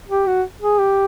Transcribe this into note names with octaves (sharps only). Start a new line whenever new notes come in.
G4
F#4
G#4
G4